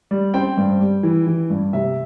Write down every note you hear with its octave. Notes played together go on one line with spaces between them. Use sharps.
G3
C4 G5
G2
G3
E3
E3
G2
C3 E5